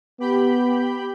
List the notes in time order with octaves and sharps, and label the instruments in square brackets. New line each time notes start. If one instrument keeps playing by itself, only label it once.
[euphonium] B3 [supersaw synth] G4 B5 G6